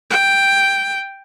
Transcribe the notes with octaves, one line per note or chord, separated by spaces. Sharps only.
G5